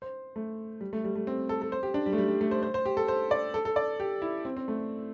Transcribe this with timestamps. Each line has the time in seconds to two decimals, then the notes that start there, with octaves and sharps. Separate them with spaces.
0.02 C5
0.36 A3
0.81 G3
0.93 A3
1.04 G3
1.16 A3
1.27 C4
1.49 A4
1.62 A4
1.72 C5
1.83 G4
1.94 D4
2.06 G3
2.13 A3
2.18 G3
2.28 G3
2.41 A3
2.51 C5
2.63 C5
2.74 C5
2.86 G4
2.97 A4
3.08 C5
3.31 D5
3.54 A4
3.65 A4
3.76 D5
4.00 G4
4.22 E4
4.45 C4
4.57 C4
4.68 A3